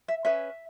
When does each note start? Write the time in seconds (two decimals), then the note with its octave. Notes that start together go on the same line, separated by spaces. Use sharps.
0.08 E5
0.25 C#4 G#4 B4 E5